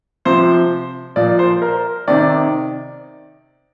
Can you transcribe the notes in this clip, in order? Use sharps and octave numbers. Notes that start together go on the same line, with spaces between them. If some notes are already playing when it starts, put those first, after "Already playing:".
C3 F3 C5
A#2 F3 D5
C5
A#4
C3 D#3 D5